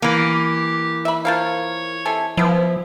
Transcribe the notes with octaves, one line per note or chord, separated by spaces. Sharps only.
E3 A#3 G4
E5 B5
F3 A#4 C#5 F5
C3 A4 G#5
F3 B3 E4